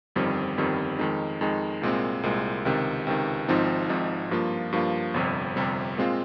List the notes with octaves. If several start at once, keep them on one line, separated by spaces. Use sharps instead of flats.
G1 F2 D#3 G3 C4
G1 F2 D#3 G3 C4
F2 D#3 G#3 D#4
F2 D#3 G#3 D#4
C2 A#2 G#3 C4
C2 A#2 G#3 C4
C#2 C3 D#3
C#2 C3 D#3
G#1 G#2 F3 C4 D#4
G#1 G#2 F3 C4 D#4
G2 F3 A#3 F4
G2 F3 A#3 F4
G1 F2 C3 G3
G1 F2 C3 G3
A#2 G#3 C4 F4